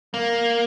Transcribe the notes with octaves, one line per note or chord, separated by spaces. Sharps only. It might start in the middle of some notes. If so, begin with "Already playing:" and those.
A#3